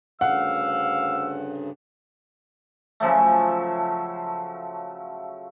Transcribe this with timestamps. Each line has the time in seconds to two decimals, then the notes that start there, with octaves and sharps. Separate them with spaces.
0.21 D2 G2 C#3 F5 F#5 E6
3.00 C#3 F3 F#3 A3